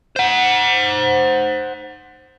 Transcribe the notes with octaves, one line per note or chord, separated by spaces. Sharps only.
C5 F#5